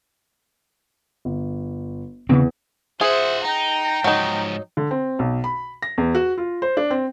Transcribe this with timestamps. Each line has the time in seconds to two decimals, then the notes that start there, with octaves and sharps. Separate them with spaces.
1.25 G1
2.29 E2 C#3 C4
3.01 F4 G#4 C5 E5 F#5
3.44 D#4 G5 A#5
4.04 G#2 F3 F#3 D#4
4.77 D3
4.91 C4
5.19 B1
5.44 B5
5.82 A#6
5.98 E2
6.15 F#4
6.38 F4
6.62 C5
6.77 D4
6.91 C4